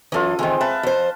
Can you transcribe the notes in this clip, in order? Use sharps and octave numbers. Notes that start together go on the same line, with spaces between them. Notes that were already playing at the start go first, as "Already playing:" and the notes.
F#2 E3 F4 A4 D#6
D#3 E3 G#3 C4 C5
B4 E5 A5
F2 C5